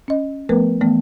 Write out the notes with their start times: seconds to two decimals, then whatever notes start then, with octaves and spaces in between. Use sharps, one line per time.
0.08 C#4 D#5
0.49 F3 A3 B3 A#4 B4
0.81 E3 A3 B3